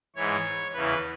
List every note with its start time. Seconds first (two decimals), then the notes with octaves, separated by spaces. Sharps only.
0.16 G#2 E3 C#5
0.73 E2 C#3 E3 B4